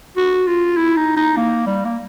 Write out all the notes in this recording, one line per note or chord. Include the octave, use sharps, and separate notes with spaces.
F#4
F4
E4
D#4
D#4
A#3
G3
A#3